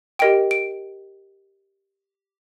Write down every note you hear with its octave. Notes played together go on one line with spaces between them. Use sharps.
G4 A#4 D#5 G5 D7
D7